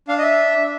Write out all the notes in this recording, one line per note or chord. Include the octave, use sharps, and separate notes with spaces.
D4 F5
D#5
E5